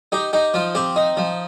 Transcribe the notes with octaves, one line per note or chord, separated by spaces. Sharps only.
D#4 G4
D#4 G4
F3 F4
C4 G4
D#4
F3